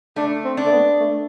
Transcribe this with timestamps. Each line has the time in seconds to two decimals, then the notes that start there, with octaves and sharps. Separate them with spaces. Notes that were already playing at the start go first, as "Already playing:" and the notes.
0.16 A3 D4
0.44 C4
0.57 D4
0.66 A3
0.71 B3
1.00 A3